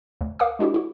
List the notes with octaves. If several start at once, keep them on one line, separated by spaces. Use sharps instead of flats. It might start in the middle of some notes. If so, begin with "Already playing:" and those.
D2
A#4 F5 F#5 D6 D#6
G#3 D4 E4 F#4 G4
E4 F#4